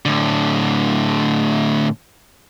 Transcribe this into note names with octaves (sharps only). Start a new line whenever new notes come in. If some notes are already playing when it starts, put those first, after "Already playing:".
A2 D3